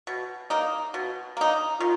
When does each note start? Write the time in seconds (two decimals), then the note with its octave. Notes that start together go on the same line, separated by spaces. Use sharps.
0.07 B2
0.50 A#3 D#4
0.94 B2
1.37 A#3 D#4
1.80 D#3 F4